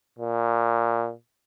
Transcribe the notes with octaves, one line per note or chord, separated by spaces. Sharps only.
A#2